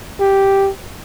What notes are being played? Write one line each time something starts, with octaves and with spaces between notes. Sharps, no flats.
G4